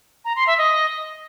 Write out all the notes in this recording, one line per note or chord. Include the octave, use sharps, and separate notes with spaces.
A#5
C6
E5
D#5